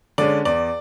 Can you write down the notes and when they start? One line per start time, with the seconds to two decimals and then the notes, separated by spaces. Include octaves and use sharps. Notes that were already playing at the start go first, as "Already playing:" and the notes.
0.18 D3 G#3 C#4 D5
0.45 E2 D5